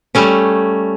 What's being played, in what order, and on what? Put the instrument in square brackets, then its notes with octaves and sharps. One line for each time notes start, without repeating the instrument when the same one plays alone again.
[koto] G3 A3 C#4